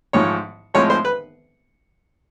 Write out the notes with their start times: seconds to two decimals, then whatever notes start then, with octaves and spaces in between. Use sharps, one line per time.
0.13 A1 G#2 F3 C#5
0.74 A2 F3 G#3 C4 C#5
0.90 C5
1.05 B4